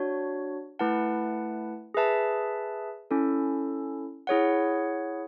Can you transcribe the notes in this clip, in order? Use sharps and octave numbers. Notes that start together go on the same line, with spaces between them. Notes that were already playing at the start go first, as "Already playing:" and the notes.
Already playing: D4 F#4 C#5
A3 E4 B4 F#5 A5
G#4 B4 E5 A5
C#4 E4 A4
E4 G#4 C#5 F#5